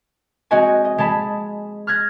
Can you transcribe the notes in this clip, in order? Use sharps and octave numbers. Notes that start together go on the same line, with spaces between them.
G#3 C4 F#4 D#5 G#5
D#5
G#3 G#4 A5 B5
F6 F#6 G#6 A#6